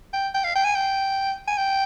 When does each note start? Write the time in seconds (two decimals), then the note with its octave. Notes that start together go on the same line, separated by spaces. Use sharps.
0.13 G5
0.34 G5
0.44 F5
0.55 G5
0.64 G#5
0.75 G5
1.48 G#5
1.58 G5